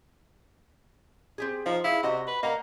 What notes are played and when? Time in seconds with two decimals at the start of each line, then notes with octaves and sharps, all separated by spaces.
1.38 C4 G4 G#4
1.66 F3 D#4
1.84 E4 G#4 F5
2.03 C3 F#4 D#5 F#5
2.27 B4
2.43 A#3 D#5 F#5 A#5